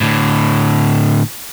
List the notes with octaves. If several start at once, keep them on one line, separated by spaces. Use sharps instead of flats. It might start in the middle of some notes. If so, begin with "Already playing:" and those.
A2 D3